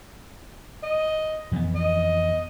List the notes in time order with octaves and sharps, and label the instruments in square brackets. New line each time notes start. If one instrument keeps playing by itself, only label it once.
[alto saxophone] D#5
[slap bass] F2 E3 B3
[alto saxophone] D#5